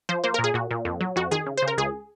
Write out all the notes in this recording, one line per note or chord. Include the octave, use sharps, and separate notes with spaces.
F3 C5
A#3 C5
A#2 A#4
G#4
A#2 F#4
A#2
F2
F#3
F2 F#4
D#3 G#4
C#3
C#3 C5
A#4
C#2 G#4